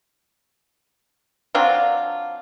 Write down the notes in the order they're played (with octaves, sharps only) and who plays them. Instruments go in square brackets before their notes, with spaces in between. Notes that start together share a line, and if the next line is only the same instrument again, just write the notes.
[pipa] F#3 C4 D4 F4